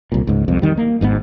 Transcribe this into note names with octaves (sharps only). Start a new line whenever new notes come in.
C2 A#2
C#2 G#2
C2 F2
D#3 G3
A#3
G#1 G#2 C#3 B3